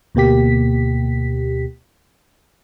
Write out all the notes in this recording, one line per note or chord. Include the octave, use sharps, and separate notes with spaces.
D2 B2 A#3 G4 B6